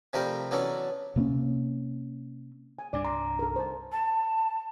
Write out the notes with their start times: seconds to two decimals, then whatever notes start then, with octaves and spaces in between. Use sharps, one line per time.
0.13 C3 F3 G3 A3 A#4 G5
0.51 E3 F#3 B3 C#4 A4 D5
1.16 C3 A#3 C4 C#4
2.79 G#5
2.93 C2 G2 D4 D5 G#5
3.05 A#5 C6
3.39 A4 A#4
3.56 C5 A5
3.92 A5